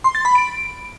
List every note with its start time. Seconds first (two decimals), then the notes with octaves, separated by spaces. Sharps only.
0.04 C6
0.15 A6
0.25 B5
0.35 D7